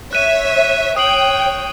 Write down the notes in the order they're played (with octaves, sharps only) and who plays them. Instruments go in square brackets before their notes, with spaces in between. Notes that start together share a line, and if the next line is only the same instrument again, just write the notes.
[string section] C#5 E5 [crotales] F#6 D#7 E7
[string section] C#5 G5 [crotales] D#6 C7 F#7